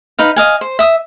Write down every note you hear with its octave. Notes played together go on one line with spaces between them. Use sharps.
D#4 B4 F5
D#5 F5 G#5
C5
E5 D#6